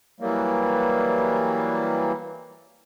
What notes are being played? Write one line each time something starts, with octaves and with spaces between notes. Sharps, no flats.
E3 F#3 G3 A#3